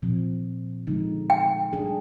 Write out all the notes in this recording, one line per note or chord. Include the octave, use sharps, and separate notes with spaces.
A#2 F3 C4
D3 F3 G#3 D#4
G5
G3 D4 G#4